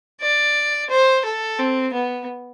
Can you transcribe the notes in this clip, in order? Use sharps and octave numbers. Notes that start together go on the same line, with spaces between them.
D5
C5
A4
C4
B3